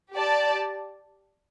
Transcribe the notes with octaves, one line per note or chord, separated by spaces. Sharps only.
G4 D5 A5